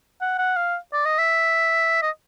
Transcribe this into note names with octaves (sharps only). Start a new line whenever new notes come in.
F#5
F#5
F5
D5
D#5
E5
D#5